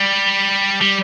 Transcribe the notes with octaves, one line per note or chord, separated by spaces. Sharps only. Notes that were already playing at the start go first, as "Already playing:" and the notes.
Already playing: G3
G3